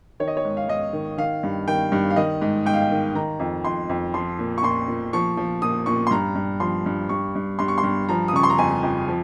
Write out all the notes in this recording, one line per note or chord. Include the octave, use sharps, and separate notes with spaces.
D#3 C#5
D#5
C#5
G#2
F5
G#2 D#5
D#3
D#3 F5
G2
D#3 G5
G2
F5
D#3 D#5
G#2
G#2 G5
F5
G5
D#3
D#3 A#5
F2
F2 C6
F2
F3 C6
A#2
C#6
A#2 C6
A#2
F3 C#6
F3
A#2 D#6
A#2 C#6
C6
G2 A#5
G2
F3 C6
G2
G2 C#6
G2
G2 C6
C#6
C6
G2
F3 A#5
D#6
C#3 C#6
C6
A#5
F2 G#5
F2
F3